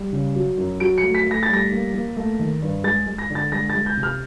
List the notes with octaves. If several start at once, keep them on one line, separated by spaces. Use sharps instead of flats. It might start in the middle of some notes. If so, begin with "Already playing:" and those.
Already playing: G3
C#3
F#3
F#2
F#3 D7
C#7
A3
B6
A3 A#6
A6
G3 A#6
A#3
A#3
A3
D#3
G2
G#3 A6
G#3
A#6
D3
A6
G#3 A#6
A6
G#3
G6
C3
F6